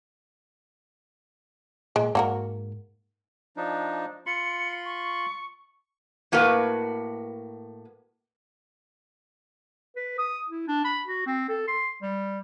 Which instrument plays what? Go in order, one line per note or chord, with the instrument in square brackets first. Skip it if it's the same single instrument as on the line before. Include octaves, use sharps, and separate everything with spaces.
[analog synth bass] A#2 [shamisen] G#3
[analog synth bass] G#2 [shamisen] A#3 F#4 A#4
[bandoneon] F3 D4 D#4
[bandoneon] F4 B5 C6 [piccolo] C#7
[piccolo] C#6
[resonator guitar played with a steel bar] A2 A#3 F#4 A#4 B4
[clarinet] B4
D#6
E4
D4
B5
F#4
C4
A4
C6
G3